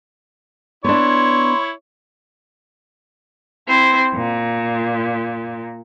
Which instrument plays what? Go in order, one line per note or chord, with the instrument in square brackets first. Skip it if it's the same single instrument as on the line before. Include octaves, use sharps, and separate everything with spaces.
[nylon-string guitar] B3 D4 [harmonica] E4 C#5 [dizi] C6
[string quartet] C4 E4 C5
A#2